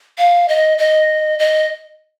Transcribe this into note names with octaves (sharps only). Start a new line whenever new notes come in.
F5
D#5
D#5
D#5